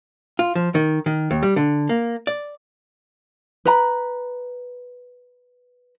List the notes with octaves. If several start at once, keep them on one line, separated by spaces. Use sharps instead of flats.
F4
F3
D#3
D#3
D#2
G3
D3
A#3
D5
B4 A#5 B5